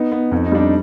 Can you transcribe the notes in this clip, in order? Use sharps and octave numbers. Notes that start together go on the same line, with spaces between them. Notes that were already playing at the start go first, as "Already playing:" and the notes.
Already playing: B3 D#4
B3
F2 D#4
D#4
G3 D4
D#4